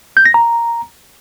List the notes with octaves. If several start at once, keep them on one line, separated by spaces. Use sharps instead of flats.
G6
A#6
A#5